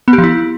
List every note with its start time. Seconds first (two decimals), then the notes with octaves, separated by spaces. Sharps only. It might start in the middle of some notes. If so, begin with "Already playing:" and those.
0.08 B3
0.13 G4
0.18 F3
0.24 E4